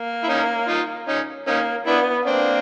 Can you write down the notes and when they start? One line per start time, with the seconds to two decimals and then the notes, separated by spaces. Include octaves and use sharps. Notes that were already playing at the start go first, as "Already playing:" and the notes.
Already playing: A#3
0.24 E4
0.29 C#4 D#4
0.68 D#4 F4
1.08 C#4 D#4
1.47 A#3 C#4 D#4
1.86 B3 D4 E4
2.26 A#3 C4 D4